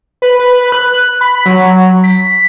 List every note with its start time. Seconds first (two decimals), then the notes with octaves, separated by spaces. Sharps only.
0.22 B4
0.39 B4
0.72 F#6
1.21 B5
1.46 F#3
2.04 B6